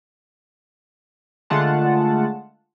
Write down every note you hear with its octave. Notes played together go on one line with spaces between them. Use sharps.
D3 G#3 A3 F4 F#5 A5